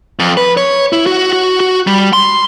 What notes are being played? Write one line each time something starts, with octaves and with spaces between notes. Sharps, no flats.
F2
B4
C#5
E4
F#4
F#4
F#4
G3
C6